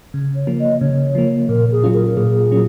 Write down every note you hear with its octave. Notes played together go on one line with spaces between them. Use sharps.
C#3
C#5
F3 A#3
D#5
C#3 C#5
F3 A#3
A#2 A#4
G#4
F#3 C#4 F4
A#4
A#4
A#2 G#4
F#3 C#4